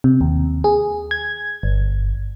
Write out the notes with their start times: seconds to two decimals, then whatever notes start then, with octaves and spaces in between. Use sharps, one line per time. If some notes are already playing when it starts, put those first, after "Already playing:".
0.04 C3
0.21 D#2
0.64 G#4
1.11 G#6
1.63 G1